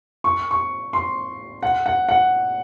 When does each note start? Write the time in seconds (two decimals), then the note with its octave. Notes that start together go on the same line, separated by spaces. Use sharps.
0.24 C#6
0.51 C#6
0.93 C6
1.63 F#5
1.86 F#5
2.09 F#5